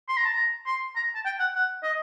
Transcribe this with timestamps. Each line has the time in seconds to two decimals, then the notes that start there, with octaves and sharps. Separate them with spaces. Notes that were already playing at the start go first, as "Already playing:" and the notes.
0.09 C6
0.17 A#5
0.25 A5
0.33 A#5
0.66 C6
0.96 A#5
1.15 A5
1.26 G5
1.39 F#5
1.55 F#5
1.83 D#5